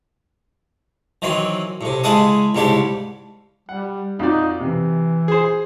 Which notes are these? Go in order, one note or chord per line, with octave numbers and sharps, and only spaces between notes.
D#3 E3 F#3 C4
A2 C3
C#3 G#3 E4 F#5 A5 D#6
C2 G#2 C#3 G4 A4
G3 F#5
F2 D#4 F#4 D5
C3 E3
G#4 C5